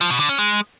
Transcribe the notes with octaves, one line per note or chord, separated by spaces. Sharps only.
F3
B2
D3
C#4
G#3